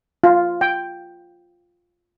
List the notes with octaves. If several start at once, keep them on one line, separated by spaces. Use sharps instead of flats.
F4
G5